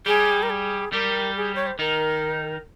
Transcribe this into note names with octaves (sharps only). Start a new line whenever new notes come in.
G3 G4 G#4
A#4
G#4
G3 G4 A#4
G#4
C#5
C5
D#3 D#4 A#4